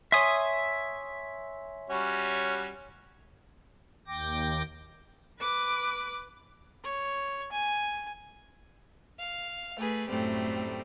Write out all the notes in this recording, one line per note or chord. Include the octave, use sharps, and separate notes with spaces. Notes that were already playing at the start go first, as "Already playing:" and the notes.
C#5 E5 G#5 C6 D#6
G3 C#4 F#4
D#2 G5 D6 A#6
B4 D6
C#5
G#5
F5
A3 G#4 B4
F#2 A2 F#3 G3 A3 C4